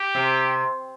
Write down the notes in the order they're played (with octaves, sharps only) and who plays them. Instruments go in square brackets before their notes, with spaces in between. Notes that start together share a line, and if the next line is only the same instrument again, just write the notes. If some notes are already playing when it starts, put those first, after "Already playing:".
Already playing: [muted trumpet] G4
[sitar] C3